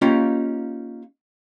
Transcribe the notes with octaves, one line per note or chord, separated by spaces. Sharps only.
A#3 C#4 D#4 F4 G4